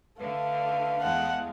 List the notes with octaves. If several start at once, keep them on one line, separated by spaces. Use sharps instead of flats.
D3 A3 B4 F5
E2 G#3 F#5 A5